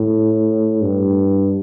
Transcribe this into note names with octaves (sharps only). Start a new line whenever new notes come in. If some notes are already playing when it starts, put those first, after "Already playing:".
Already playing: A2
G2